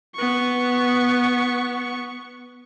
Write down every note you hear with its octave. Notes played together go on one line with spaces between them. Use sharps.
B3 C#6